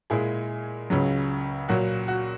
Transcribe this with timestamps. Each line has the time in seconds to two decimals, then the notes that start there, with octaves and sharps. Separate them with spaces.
0.10 A#2 G#3 E4 G#4
0.90 C#2 C#3 F#3
1.69 A#2 F#3 F#4
2.08 F#4